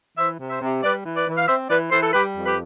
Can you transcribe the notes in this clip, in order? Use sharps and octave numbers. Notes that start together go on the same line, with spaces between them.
E3 C5 E5
C3
C5 E5
C3
G3 B4 D5
E3
B4 D5
E3
F5
C4 C5 E5
E3 B4 D5
E3 A4 C5
A4
G3 G4 B4
F2
G4 B4